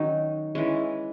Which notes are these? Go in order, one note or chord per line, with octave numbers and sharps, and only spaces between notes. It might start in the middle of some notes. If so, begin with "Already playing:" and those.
Already playing: D#3 F#3 C#4 D#4
E3 G#3 C#4